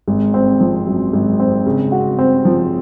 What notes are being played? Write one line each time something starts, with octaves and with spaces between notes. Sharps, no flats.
G#1
C4
F3
F#2
G#1
C4
C#3
F#4
C4
F3